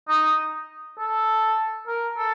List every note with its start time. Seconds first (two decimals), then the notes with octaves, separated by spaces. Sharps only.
0.08 D#4
0.98 A4
1.88 A#4
2.17 A4